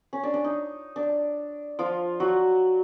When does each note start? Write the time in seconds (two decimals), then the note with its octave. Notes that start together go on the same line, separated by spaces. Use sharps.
0.13 C#4
0.23 D4
0.34 D4
0.44 D#4
0.96 D4
1.79 F3 F4
2.20 F#3 F#4